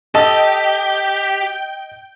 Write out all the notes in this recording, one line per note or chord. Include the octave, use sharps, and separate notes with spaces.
G4 A4 D#5 G5